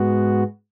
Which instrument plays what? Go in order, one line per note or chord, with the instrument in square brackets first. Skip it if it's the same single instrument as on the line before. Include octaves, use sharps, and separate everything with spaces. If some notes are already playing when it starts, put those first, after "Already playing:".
Already playing: [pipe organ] G#2 G#3 B3 F#4